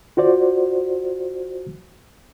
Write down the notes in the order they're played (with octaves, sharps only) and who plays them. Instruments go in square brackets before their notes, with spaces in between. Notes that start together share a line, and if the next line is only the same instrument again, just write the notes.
[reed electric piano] F4 F#4 C5 D5